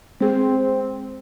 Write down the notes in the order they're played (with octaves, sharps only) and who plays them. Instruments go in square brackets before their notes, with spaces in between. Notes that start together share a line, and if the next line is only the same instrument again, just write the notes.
[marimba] G#3 G#4 [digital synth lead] C4